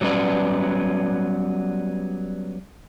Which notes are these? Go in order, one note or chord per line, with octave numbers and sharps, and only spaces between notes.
F#3 G3 B3 C#4 B4 D5